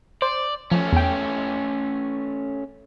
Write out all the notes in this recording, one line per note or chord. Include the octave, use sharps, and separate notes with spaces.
C5 D5
F3 A3 C#4
E2 G5